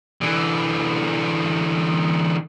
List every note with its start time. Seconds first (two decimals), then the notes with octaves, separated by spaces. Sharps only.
0.21 D3 E3